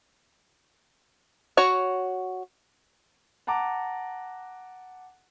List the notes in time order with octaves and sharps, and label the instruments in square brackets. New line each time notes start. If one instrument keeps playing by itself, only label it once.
[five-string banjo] F#4 C#5 F#5
[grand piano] F#5 A5 A#5 D6